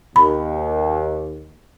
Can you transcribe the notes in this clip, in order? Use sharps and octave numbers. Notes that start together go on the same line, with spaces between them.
D#2 B5